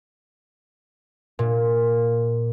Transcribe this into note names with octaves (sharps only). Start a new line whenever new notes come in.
A#2